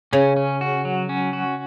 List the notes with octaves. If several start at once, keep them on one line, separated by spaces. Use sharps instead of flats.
C#3 C#4
C#4
F#4
F#3
C#4
F#4